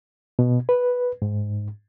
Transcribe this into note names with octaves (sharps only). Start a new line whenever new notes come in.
B2
B4
G#2